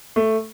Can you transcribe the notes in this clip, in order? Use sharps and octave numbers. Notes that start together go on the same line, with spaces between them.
A3